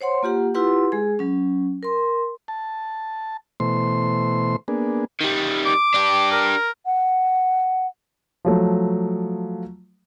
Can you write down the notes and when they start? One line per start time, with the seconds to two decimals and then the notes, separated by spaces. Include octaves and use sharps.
0.01 C5 C#5 F#5 C6
0.23 A#3 F4 G4 F#5
0.54 E4 F4 G4 B4 F#5 C6
0.92 G#3 G#4
1.19 F#3 C#4
1.83 A#4 C6
2.48 A5
3.60 B2 E3 A3 C5 C6
4.68 A#3 B3 D4 G#4
5.21 D#3 G3
5.66 D6
5.94 D4 G4
6.32 A#4
6.86 F#5
8.45 F3 F#3 A3